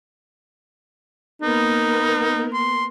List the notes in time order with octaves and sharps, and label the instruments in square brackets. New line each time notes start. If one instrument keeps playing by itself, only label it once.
[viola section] A#3 B3 A#4 [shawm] D#4
[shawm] C6